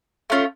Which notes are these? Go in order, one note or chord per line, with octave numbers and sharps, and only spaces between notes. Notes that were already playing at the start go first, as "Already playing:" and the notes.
A3 C#4 F4